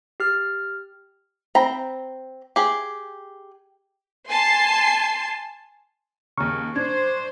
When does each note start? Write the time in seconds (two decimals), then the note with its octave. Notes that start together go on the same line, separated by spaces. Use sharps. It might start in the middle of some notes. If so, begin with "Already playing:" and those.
0.20 G4 F6
1.55 C4 G5 A#5 B5
2.56 G4 G#4
4.30 G#5 A5 C6 C7
6.38 D#2 C#3 A#5 C#6 F6
6.76 D4 C5 G#6